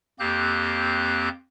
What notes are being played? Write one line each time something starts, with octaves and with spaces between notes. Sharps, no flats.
F2 A#3 C4 G4 F#6 G6